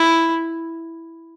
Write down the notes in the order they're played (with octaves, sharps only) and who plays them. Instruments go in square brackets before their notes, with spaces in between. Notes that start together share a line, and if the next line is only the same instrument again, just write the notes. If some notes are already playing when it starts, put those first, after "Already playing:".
Already playing: [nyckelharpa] E4